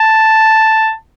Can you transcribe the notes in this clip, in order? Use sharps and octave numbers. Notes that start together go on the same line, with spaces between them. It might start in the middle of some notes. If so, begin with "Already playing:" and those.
Already playing: A5